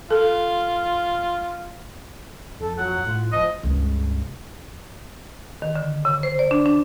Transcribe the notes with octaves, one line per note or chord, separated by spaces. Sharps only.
F4 A4
F2 A4
F#3 F#5
A2 F4
D1 F3 D#5
C#2 G2
D#3
D3
C#3
C5
D5
D4
D4